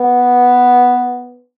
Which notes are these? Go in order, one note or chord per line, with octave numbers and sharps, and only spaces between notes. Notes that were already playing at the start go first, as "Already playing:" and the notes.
Already playing: B3